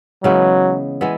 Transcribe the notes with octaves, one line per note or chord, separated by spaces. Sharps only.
C#3 E3 F#3 G#3 B3
E3 G#3 B3